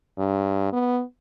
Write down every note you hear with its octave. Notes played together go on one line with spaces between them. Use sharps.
G2
B3